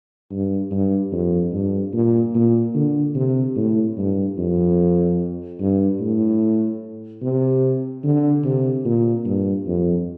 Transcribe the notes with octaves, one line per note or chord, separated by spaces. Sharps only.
G2
G2
F2
G2
A#2
A#2
D3
C3
A2
G2
F2
G2
A2
C3
D3
C3
A#2
G2
F2